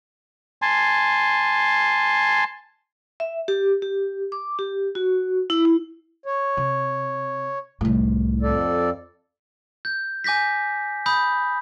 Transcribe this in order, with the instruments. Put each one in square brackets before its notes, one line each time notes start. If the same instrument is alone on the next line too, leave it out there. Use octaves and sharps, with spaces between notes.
[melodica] G#5 A5 C6
[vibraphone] E5
G4
G4
D6
G4
F#4
E4
E4
[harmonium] C#5
[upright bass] C3
C2 A2
[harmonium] F2 A4 D5
[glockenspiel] G6
G#5 D6 G6 A#6 B6
B5 D#6 G6